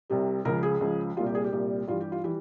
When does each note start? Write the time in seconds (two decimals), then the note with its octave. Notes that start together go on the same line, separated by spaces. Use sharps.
0.10 C2 C3 G3
0.45 C#2 C#3 F3 A#4
0.63 G#4
0.81 C#2 C#3 F3
1.17 C2 A#2 G3 F4
1.26 G4
1.35 G#4
1.44 G4
1.52 C2 A#2 G3
1.88 G2 E3 G3 F4
2.00 G4
2.12 F4
2.24 E3 G3 E4